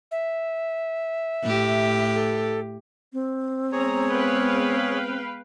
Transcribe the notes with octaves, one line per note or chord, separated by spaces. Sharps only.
E5
A2 G4
A4
C4
G#3 B3 G#4 C#5 A#5
B4 F5 G5